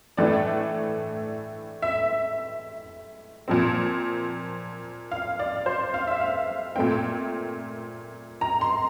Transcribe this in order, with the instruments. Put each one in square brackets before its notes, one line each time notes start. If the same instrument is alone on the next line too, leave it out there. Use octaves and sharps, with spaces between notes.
[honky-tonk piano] A2 E3 A3 D4 D5
E5
A#2 F3 C4
F5
D5
C5
F5
E5
F5
A#2 A3 C4 G5
A#5
C6